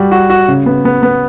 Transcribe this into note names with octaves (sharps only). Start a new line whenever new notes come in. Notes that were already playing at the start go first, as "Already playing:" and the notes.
Already playing: G3 F#4
F#4
F#4
C#3
B3
B3
B3